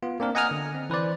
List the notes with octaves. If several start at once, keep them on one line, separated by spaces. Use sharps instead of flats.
B3 F4
A#3 C4 D4 A#4
D#5 F#5 G#5 A#5 D#6 F6
D3
C4
E3 B4 C5 D5